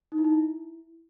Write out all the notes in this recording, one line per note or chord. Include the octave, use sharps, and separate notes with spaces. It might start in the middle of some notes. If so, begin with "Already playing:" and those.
D#4
E4
D#4
E4